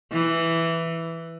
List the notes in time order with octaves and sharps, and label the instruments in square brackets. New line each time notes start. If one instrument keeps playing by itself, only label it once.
[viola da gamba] E3